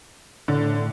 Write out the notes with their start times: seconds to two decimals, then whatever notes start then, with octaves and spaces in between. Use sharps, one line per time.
0.48 A2 D3